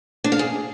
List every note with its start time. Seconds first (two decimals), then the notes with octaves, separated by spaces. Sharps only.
0.24 D4
0.32 F5
0.39 G#4